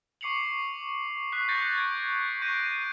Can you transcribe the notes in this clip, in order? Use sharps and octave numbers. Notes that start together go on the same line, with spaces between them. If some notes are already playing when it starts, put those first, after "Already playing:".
C#6 D6 C7 C#7 F7 F#7
C#6 D#6 F#6 B6 C7
C#6 G6 A6 A#6 C#7
G#6 A#6 D7
C#6 G6 A#6 C7 D7 D#7